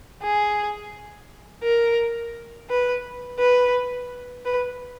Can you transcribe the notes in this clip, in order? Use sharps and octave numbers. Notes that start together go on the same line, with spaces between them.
G#4
A#4
B4
B4
B4